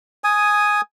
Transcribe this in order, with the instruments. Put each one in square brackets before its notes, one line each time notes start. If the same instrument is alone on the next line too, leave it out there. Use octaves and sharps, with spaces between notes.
[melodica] G#5 D#6